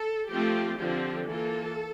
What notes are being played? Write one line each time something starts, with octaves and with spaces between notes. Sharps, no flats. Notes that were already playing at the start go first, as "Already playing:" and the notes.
Already playing: A4
F3 A3 C4 F4 G4
D3 F3 C4 F4 G4
E3 A#3 F4 A4